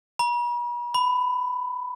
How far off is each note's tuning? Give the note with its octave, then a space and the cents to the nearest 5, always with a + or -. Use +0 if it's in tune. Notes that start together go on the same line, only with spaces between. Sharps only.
B5 -45
B5 +15